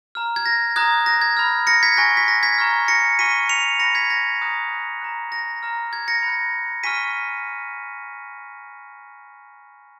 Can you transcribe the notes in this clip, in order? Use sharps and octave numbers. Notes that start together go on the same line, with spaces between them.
A#5 F6
G#6
A#6
A#5 D#6 F#6 G#6
A#6
G#6
B5 F6
A#6 C#7
G#6 B6
G#5 C#6 F#6 A#6
B6
A#6
G#6 B6
A#5 C#6 F6
A#6 C#7
G#5 C#6 F6 B6 D#7
C#7 F7
B5 F#6 A#6 C#7
G#6 B6
A#6
A#5 D#6 F#6
A#5 D#6 F#6
A#6
A#5 F6
G#6
A#6 C#7
B5 F#6
G#5 C#6 F6 B6 D#7